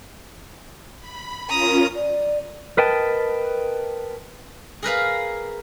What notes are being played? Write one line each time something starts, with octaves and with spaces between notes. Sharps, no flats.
B5
C#4 F4 A#4 A#5 D#6
D5
A#4 B4 D#5 G5 A5
G#4 A#4 B4 F5